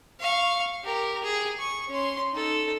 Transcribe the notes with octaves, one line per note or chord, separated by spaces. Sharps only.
F5 C#6
G4 A#4
G#4
C#6
C#4 C6
D#4 A4